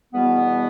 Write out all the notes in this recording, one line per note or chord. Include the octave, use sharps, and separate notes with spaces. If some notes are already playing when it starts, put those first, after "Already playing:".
E2 B2 G3 B3